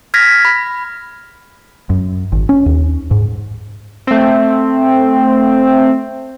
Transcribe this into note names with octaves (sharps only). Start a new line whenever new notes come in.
F6 G#6 A#6 B6
B5
F#2
G#1
C#4
D#2
G#2
A3 C4